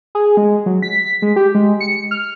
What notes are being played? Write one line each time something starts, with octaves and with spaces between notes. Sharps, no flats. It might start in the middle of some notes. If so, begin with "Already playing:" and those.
G#4
G#3
F#3
B6
G#3
G4
G#3
C#7
F6